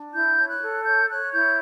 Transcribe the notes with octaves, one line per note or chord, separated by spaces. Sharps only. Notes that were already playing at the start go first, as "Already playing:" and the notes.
Already playing: D4
E4 G6
C#5
F#6
A4
C#5 G6
C#5 F#6
E4 G6